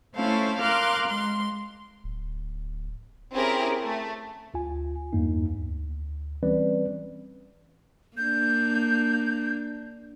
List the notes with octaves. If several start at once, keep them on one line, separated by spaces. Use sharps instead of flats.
A3 C#4 E4 C5 F5 A5
A#4 F5 C6 D6 F6 F#6
G#3 C6
D1
C4 C#4 E4 G4 G#4 A#4
A3
D2 F4 G#5
E2 G2 A#3 D#4
D2
E3 G3 C4 C#4 B4 D5
A#3 D4 G6